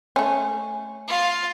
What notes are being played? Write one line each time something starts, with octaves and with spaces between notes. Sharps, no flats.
A3 C#4
F4 F5